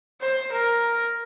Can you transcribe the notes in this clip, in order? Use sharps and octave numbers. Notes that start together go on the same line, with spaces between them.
C5
A#4